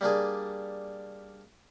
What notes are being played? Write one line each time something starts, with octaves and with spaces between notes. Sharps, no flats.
G3 A#3 D4 G#4